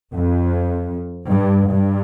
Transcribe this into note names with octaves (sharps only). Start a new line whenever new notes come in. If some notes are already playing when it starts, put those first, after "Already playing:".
F2
G2
G2